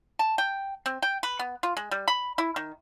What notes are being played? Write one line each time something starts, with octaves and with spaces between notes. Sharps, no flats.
A5
G5
C4
G5
B4
B3
F4
G#3
G3
B5
E4
D#3